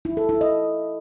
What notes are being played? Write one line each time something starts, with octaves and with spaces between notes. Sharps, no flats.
E4
A4
E4
D#5